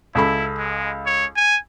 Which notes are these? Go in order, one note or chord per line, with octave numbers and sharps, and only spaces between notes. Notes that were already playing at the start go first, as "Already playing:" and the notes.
C#2 E4 A4 B5
G#3
C#5
G#5